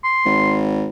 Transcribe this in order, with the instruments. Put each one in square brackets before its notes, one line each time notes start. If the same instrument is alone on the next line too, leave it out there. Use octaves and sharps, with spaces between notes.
[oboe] C6
[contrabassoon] G#1